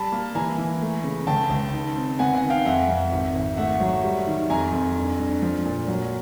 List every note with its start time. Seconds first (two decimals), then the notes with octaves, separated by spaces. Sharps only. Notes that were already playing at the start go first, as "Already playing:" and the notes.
Already playing: G3 A5 B5
0.12 A#3
0.35 E3 G#5 A#5
0.58 E3
0.81 A3
1.04 C#3
1.27 C#2 G5 A5
1.50 C#2
1.73 D#3
1.96 C4
2.19 B3 F#5 G#5
2.35 F#5 G#5
2.43 D#3
2.50 F5 G5
2.65 F2 E5 F#5
2.89 F2
3.12 G#1
3.35 G#1
3.57 A3 E5 F#5
3.80 F#3
4.04 G3
4.27 D#3
4.50 F2 G#5 A#5
4.72 F2
4.96 G2
5.19 G2
5.42 F3
5.65 A#2
5.88 F#3